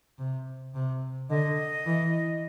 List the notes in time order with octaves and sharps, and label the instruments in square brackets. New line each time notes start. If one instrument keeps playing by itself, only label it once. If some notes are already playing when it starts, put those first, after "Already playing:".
[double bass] C3
C3
[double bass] D3 [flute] D#5
[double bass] E3